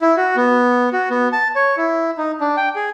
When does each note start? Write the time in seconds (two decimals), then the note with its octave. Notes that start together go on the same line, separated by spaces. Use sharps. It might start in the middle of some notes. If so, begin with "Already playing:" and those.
0.01 E4
0.17 F#4
0.36 B3
0.93 F#4
1.10 B3
1.32 A5
1.55 C#5
1.77 E4
2.18 D#4
2.41 D4
2.57 G5
2.76 G#4